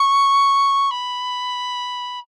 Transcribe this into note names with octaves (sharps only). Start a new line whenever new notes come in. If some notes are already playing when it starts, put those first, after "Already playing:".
Already playing: C#6
B5